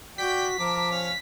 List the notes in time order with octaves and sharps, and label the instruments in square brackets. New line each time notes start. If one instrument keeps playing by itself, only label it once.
[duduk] F#4 [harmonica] D5 G5 [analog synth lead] B6
[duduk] F3 [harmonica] A#4 A5 D6
[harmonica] C#4 F5